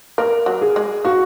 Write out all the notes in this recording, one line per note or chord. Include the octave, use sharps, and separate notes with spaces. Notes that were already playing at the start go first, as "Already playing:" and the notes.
A#3 A#4
F#3
G#4
G#3
A#3 F#4